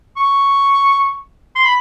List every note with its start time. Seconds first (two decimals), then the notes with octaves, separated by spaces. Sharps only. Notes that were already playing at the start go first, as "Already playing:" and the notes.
0.17 C#6
1.55 C6
1.65 B5